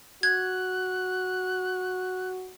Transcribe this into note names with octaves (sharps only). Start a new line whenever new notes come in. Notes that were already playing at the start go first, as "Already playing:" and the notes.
F#4 F#6 G#6